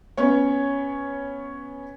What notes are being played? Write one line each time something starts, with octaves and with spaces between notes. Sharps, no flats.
B3 C#4 C#5